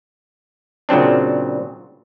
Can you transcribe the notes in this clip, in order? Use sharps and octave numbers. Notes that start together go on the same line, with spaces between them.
A#2 C#3 F#3 C4 D4